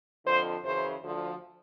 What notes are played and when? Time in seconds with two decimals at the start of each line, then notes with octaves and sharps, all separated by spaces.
0.26 F2 D3 F3 C5
0.64 F#2 C#3 E3 C5
1.03 D2 D3 F3